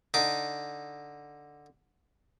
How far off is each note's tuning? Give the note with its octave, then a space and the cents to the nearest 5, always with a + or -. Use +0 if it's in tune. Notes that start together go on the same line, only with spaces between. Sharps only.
D3 +0 D#4 +0 D6 +0